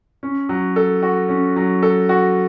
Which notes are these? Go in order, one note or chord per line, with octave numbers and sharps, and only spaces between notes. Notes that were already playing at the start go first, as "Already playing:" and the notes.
C#4
F#3
A4
F#4
C#4
F#3
A4
F#4